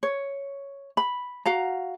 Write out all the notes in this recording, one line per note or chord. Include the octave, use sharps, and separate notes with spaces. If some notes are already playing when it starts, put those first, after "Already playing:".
C#5
B5
F#4 F5 A#5